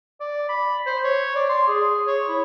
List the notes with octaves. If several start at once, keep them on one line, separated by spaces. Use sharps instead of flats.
D5
B5
C5
C#5
D5
C6
G#4
C#5
E4